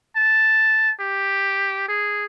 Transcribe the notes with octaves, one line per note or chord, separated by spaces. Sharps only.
A5
G4
G#4